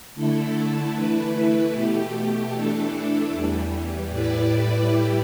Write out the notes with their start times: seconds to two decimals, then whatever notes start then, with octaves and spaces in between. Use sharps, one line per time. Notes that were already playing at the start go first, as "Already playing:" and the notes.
0.15 D3 A3 E4 A4
0.93 E3 A3 E4 B4
1.73 B2 A3 G4
2.51 E3 A3 D4 A4
3.30 E2 E3 G3
4.09 A2 G3 E4 B4 D5
4.88 A2 G3 E4 G4